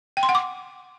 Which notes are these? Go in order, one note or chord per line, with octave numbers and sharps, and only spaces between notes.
G5
C6
F#5
D6